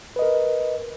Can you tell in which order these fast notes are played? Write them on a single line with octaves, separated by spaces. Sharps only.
B4 D#5 A#4